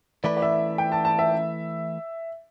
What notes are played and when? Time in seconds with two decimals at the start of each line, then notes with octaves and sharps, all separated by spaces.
0.24 E3 A3 E4 B4 D5
0.37 D5
0.42 E5
0.78 G5
0.92 A5
1.05 A5
1.19 E5